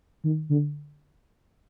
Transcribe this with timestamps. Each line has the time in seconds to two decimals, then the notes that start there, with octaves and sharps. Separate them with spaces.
0.24 D#3
0.49 D3